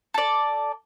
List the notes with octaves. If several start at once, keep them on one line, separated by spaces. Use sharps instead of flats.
A4 D5